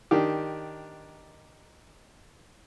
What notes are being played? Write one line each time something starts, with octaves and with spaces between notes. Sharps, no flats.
D#3 D4 G4